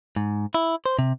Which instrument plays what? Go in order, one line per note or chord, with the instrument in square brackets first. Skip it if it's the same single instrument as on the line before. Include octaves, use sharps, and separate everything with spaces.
[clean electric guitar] G#2
E4
C5
C3